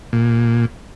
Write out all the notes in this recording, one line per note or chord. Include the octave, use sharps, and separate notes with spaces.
A#2